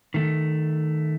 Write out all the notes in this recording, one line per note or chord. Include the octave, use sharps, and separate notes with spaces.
D#3 A3